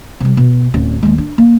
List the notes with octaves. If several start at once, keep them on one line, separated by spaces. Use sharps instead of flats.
C3 G3
B2
D1 C#4
D#2 G#3
D4
A#3